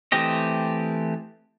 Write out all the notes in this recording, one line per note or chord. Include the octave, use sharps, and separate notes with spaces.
E3 A3 C4 G4 D#5